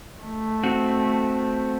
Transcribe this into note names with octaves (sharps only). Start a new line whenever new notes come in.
A3
C4 F#4